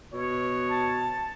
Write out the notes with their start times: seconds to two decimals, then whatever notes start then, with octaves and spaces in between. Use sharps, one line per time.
0.13 B2 C#5
0.69 A5